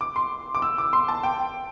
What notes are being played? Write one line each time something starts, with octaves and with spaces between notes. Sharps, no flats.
D6
C6
D6
E6
D6
C6
A5
G5